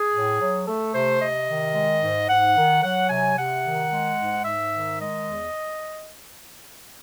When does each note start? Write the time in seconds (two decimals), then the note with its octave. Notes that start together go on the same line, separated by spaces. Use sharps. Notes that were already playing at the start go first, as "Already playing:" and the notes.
Already playing: G#4
0.14 A2
0.41 F#3
0.67 A3 A4
0.94 C3 C5
1.22 C3 D#5
1.48 D#3
1.75 G#3
2.02 G#2
2.29 G#2 F#5
2.57 D#3
2.83 F#3 F#5
3.10 C3 G#5
3.37 C3 F#5
3.64 D#3
3.90 G#3
4.18 G#2
4.44 G#2 E5
4.72 D#3
4.99 G#3 D#5
5.25 E2